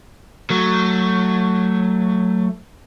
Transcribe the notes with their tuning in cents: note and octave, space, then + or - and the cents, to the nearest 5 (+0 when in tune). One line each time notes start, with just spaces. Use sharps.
F#3 +0 A3 +20